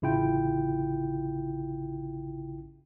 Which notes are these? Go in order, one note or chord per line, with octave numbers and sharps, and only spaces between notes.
A1 C#3 E4 F4 G5